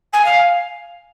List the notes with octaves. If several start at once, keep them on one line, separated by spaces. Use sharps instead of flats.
G#5
F5